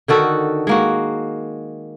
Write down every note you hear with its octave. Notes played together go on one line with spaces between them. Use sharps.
D3 D#3 F#4 A4
G#3 A#3 F#4